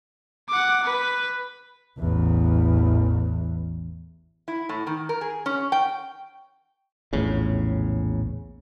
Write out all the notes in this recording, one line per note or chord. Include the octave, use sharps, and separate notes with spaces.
F#5 D6
B4
A1 E2
E4
A2
D#3
A#4
G#4
C#4
G5
A#1 E2 A2 C#3